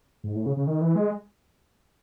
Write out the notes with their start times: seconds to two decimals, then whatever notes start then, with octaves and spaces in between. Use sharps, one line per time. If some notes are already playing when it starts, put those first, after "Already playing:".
0.24 G#2
0.35 A2
0.46 C#3
0.57 C#3
0.67 D#3
0.81 E3
0.96 G#3